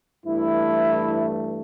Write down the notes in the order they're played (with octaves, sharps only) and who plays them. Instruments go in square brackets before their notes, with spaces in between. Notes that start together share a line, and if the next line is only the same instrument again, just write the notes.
[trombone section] G2 E3 A3 E4